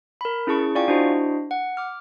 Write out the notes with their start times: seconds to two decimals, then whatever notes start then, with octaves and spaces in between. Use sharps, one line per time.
0.21 A#4 B5
0.47 C#4 E4 G#4 A5 C#6 D7
0.75 F4 D5 F5 G5 G#5 C#6
0.88 D4 E4 F#4 C5 D#5
1.51 F#5
1.77 D6 F6